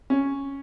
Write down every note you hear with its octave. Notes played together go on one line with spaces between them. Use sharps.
C#4